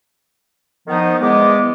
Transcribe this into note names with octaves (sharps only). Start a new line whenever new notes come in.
D#3 F3 B3 D#4
E2 G#3 B3 D6